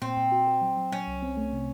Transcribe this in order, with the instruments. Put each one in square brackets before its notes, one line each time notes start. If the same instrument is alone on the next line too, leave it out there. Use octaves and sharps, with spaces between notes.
[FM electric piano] A#2 [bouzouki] C4
[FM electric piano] A#2
F#4
F#4
F#3
F#3
[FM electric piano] F#3 [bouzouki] C#4
[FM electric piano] C2
C4
A3
C3